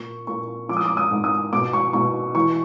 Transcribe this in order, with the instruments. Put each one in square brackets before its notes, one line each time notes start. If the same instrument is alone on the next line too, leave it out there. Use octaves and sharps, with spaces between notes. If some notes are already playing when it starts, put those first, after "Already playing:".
Already playing: [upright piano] A#2 C#6
A#2 C#6
F3 D6
D#6
D6
D#6
G#2
D#6
B2 D6
C#6
B2 C#6
E3 C#6